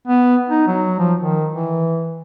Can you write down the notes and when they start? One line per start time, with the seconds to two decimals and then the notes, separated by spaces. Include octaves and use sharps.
0.07 B3
0.49 D#4
0.67 F#3
0.99 F3
1.19 D#3
1.53 E3